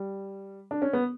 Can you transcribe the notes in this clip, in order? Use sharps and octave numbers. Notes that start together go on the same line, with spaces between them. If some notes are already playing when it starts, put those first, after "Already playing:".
Already playing: G3
D4
C#4
B3